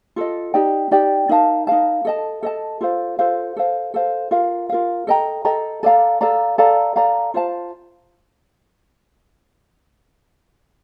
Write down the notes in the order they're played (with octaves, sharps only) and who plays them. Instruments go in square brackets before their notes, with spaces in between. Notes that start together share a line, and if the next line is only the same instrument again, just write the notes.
[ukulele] F4 A4 D#5
D#4 G4 D5 G5
D#4 G4 D5 G5
D#4 A#4 F5 A5
D#4 A#4 F5 A5
A4 D#5 A5
A4 D#5 A5
F4 A4 C5 F5
F4 A4 C5 F5
A4 C5 F5
A4 C5 F5
F4 A#4 F5
F4 A#4 F5
A4 D#5 G5 A#5
A4 D#5 G5 A#5
A4 D5 F5 A#5
A4 D5 F5 A#5
A4 D5 F5 A#5
A4 D5 F5 A#5
F4 C5 F5 A5